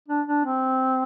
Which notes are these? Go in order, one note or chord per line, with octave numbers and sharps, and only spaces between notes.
D4
D4
C4